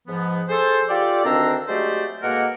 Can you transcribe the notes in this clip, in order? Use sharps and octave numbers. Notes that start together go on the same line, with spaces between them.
G#2 F3 B3
G#4 A4 C5
F4 G4 A4 D5
D2 D#3 C4 D4 A#5 E6
F#3 G#3 A3 G4 C5 D5
B2 G#3 A#3 A4 A#4 F#5